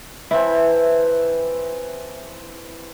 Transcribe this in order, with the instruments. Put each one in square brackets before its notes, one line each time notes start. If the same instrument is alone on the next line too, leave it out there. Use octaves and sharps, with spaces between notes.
[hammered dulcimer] E3 C4 A5 [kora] E4